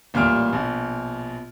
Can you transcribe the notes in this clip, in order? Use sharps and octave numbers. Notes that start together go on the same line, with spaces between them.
A1 A#2 G3 F6 D7
A#1 B2